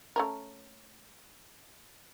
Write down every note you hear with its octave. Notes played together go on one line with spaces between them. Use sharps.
A3 C#4 A#4